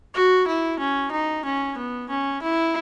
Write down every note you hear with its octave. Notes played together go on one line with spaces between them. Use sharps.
F#4
E4
C#4
D#4
C#4
B3
C#4
E4